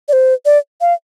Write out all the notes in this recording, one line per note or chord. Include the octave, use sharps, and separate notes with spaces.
D5
C5
D5
F5